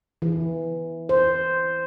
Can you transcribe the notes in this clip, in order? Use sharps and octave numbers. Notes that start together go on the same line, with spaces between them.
E3
C5